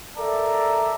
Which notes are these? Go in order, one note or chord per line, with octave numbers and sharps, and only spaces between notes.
A4 A#4 D5 E5 A5 A#5